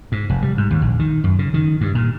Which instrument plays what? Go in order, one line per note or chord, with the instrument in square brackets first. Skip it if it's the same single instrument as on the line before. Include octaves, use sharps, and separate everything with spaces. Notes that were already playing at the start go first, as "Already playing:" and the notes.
[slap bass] G#2
F1
G3
G#2
D#2
A#1
D#3
F#2
C#3
D#3
G2
A#2